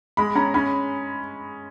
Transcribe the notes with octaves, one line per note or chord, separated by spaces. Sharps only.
G#3 B5
C#4 A#5
C#4 B5